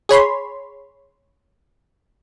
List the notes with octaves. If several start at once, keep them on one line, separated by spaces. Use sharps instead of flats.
G#4 C#5 B5 C6